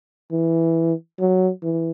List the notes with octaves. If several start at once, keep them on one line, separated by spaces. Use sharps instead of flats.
E3
F#3
E3